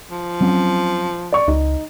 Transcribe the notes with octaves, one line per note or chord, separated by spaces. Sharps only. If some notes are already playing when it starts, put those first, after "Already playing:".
F3
F#3 C4 C#4
D5 C#6
C#2 D#4